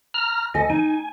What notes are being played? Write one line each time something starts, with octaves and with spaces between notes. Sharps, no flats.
A#5 F6
D2 A4 D#5 G#5
D#4 G#5